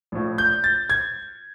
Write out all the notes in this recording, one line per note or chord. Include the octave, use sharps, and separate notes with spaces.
A#1 A2 F3
G6
A6
G#6